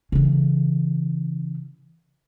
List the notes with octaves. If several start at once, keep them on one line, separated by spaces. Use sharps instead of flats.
C#3 E3